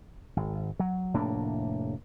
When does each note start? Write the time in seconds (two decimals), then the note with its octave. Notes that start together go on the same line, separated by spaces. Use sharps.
0.36 G#1
0.80 F#3
1.14 F1 A2 A#3 D4